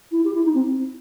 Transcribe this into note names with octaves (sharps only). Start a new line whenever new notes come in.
E4
G4
E4
D#4
C4